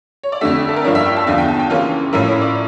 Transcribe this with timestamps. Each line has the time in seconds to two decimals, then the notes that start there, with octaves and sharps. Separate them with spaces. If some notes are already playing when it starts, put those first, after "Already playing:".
0.23 C#5
0.32 D5
0.41 F2 D3 A3 E5
0.69 A4
0.76 A#4
0.84 G2 F3 A#3 D4 C#5
0.95 E5
1.06 G5
1.16 A5
1.27 E2 D3 F3 F5
1.38 G5
1.48 A5
1.59 G5
1.70 C#3 E3 A#3 C#4 F4 F5
2.13 A2 F3 C#4 E4 A#4
2.27 C#5
2.42 D5